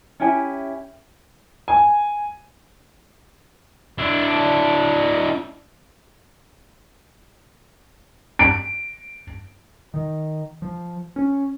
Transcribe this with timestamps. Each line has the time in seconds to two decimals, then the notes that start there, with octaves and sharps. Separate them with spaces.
0.20 C#4 E4 G4 G#5
1.68 G#5
3.98 D4 E4
8.39 D7
9.94 D#3
10.62 F3
11.16 C#4